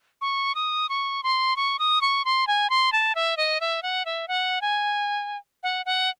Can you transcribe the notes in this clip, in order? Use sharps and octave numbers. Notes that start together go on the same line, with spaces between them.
C#6
D#6
C#6
C6
C#6
D#6
C#6
C6
G#5
C6
A5
E5
D#5
E5
F#5
E5
F#5
G#5
F#5
F#5